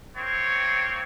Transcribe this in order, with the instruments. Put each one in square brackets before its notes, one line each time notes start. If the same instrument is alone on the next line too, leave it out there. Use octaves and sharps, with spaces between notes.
[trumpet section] A#3 C4 C#5